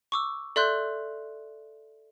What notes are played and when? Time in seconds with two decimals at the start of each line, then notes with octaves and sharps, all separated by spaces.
0.12 C#6 D6 E6
0.56 A4 D5 E5 C6 F#6 G6